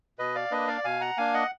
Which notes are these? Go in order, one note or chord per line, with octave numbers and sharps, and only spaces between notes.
B2 B4 D#5
D5 F5
A#3 D4 B4 D#5
D5 F5
B2 F5 G#5
F#5 A#5
A#3 D4 F5 G#5
D#5 F#5